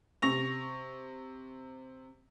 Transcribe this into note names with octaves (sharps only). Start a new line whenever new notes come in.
C3 C#6 A#6 F7